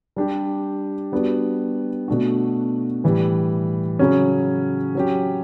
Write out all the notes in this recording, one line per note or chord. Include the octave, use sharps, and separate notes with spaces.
G3 D4 G4
G3 B3 D4 F#4
B2 A3 D4 F#4
A2 E3 G3
C#3 F#3 C#4
F#3 C#4 G4